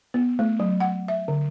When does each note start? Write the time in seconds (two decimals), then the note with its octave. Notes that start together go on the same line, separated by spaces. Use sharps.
0.14 B3
0.39 A3
0.60 F#3
0.80 F#5
1.08 E5
1.28 D3